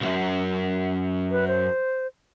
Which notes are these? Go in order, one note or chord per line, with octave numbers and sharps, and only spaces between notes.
C2 F#2
B4
C5